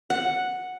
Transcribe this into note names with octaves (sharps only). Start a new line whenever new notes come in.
F#5